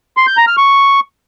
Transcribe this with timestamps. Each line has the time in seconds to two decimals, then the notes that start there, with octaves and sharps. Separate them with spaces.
0.17 C6
0.27 G6
0.37 A#5
0.47 F6
0.57 C#6